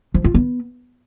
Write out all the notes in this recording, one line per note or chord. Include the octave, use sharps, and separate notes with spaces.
F3
F4
B3